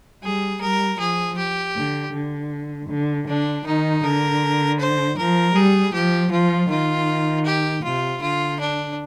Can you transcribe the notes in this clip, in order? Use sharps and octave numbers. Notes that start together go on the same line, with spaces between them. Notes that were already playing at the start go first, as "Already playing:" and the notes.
G3 G#4
G3 A#4
F3 G#4
G4
D3
D3
D3
D3 D4
D#3 D#4
D3 A#4
C5
F3 A#4
G3 G#4
F3 G4
F3 F4
D#3 F4
G4
C3 F4
D3 F4
D4